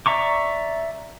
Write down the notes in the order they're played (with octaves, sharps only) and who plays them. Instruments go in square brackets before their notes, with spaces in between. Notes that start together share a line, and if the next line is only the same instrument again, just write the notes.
[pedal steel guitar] D5 E5 A#5 C#6 D6